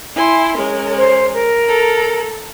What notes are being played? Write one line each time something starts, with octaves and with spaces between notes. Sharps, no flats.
E4 G#5 C6
G#3 C#4 A#4
C5
A#4
A4 A#5